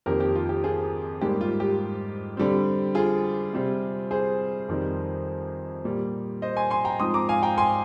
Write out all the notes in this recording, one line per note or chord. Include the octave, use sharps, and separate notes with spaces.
F2 D#3 A#3 G4 A#4
G4
F4
G4
F4 G#4
G#2 G3 A#3 G4
F4
G4
D3 G3 C4
F4 G#4
C3 G3 C4
G#4 C5
F2 D#3 G3 C4
A#2 G3 A#3
C5 D#5
G#5 C6
G#5 C6
G5 A#5
G#2 F3 C4 C6 D#6
A#5 D6
F5 G#5
G5 A#5
G#5 C6